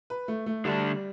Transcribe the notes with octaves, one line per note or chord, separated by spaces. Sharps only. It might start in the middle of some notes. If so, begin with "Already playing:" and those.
B4
A3
A3
D3 G3 A3 D4